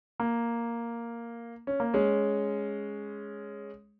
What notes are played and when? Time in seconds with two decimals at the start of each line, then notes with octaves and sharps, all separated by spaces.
0.20 A#3
1.67 C#4
1.80 A#3
1.94 G#3 C#4